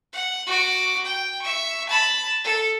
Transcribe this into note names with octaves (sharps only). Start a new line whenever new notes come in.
F#5
F#4 D6
G5
E5 C#6
A5 B5
A4